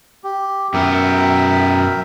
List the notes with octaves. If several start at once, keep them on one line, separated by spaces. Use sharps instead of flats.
G4
F#2 B3 A#4 E5 G5